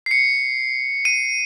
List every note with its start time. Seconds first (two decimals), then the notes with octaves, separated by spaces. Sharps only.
0.06 C7
0.11 C#7
1.05 D#7